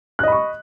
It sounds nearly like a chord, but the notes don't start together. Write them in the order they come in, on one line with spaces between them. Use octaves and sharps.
F#6 D#5 B5 C#6